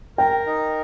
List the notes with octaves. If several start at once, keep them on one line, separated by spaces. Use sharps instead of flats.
A#4 G5
D#4